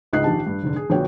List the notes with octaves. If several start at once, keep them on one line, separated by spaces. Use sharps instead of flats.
C#2 G#2 D#5 F#6 C7
A#1 D#3 G4 A5
G2
F1 G#2 D3
G#4
A#1 D3 B3 F#4 C#5 G5